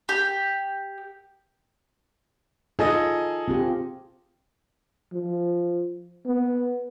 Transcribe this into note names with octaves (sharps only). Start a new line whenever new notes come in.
G4
D#4 F4 G#4 A4 D#5
C4 F4 G4
F3
B3